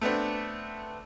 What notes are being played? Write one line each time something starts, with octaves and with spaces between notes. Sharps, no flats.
A3 B3 C4 D4